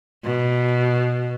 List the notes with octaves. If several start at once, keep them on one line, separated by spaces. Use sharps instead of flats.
B2